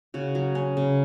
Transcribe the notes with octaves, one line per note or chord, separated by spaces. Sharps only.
C#3 F#4
F#3
C#4
C#3